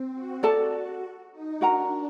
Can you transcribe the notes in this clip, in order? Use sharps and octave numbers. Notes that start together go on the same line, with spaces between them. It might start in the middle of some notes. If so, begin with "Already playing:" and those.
Already playing: C4
F#4
F#4 A4 D5 A5
D#4
D4 F#4 A#4 F#5 A#5